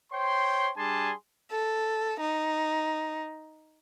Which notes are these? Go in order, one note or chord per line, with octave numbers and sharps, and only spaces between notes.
C5 C#5 G5 C6
G3 D4 G#4 G#5 A5 C6
A4
D#4